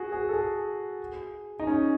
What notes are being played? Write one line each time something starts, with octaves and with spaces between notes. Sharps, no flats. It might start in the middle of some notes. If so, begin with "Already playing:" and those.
Already playing: F#4 G#4
G#4
A4
G#4
D#4
C#4